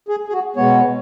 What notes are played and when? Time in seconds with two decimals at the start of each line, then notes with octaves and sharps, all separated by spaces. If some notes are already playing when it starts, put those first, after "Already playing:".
0.09 G#4
0.28 G#4
0.32 F#4
0.56 B2 G#3 B3 C#5